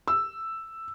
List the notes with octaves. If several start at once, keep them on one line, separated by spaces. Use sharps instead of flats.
E6